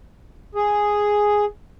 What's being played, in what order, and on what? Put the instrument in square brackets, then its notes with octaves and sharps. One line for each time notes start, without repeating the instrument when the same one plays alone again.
[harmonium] G#4